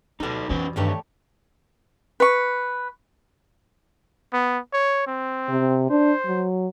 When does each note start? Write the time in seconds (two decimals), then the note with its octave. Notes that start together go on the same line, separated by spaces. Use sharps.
0.20 D2 B2 G3 D#4 A4
0.49 F2 E3 C#4 B4 C5
0.76 G2 D3 D#3 G3 A3 G4 C#5
2.20 B4 C#6
4.33 B3
4.73 C#5
5.07 C4
5.49 C3
5.90 D4 C5
6.26 F#3